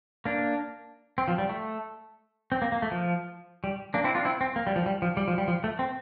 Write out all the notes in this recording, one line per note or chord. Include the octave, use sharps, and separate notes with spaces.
A#3 D4
C4
F3
G3
A3
C4
A#3
A#3
A3
F3
G3
A#3 D4
C4 E4
D4 F4
C4 E4
C4
A#3
G3
F3
G3
F3
G3
F3
G3
F3
A3
C4